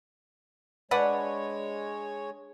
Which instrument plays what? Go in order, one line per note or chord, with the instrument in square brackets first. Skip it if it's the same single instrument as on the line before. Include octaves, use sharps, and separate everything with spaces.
[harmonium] G#3 C#5 [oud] D4 [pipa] B4 D5 F#5